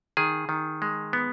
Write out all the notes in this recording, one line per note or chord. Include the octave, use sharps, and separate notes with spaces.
D#3 G#4
D#3
G#3
B3